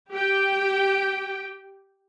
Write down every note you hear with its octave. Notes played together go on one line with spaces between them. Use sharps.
G4 G5